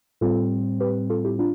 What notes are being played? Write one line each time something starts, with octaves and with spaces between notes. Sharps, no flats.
A2 G3 C4 F4 A4
G4 B4
F4 A4
E4 G4
D4 F4